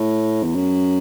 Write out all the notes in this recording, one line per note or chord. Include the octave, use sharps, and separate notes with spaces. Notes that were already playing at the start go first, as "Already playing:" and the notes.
Already playing: A2
E2
F#2